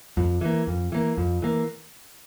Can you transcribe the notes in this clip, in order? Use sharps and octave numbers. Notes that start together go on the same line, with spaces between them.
F2
E3 A#3
F2
E3 A#3
F2
E3 A#3